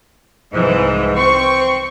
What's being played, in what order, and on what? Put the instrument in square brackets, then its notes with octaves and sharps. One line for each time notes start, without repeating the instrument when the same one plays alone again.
[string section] C2 E3 F3 [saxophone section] G#2
[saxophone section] C4 [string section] C#6